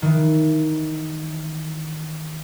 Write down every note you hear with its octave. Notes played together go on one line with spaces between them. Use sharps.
D#3 E3